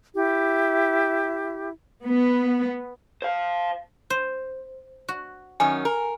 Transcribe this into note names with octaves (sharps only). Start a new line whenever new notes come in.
E4 G4
B3
C5 F5
C5
F#4
F#2 D#3 C#4 G#5
A#4